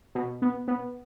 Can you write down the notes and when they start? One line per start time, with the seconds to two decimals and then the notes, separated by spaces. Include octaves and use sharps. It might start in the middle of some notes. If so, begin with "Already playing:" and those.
0.15 B2
0.42 B3
0.68 B3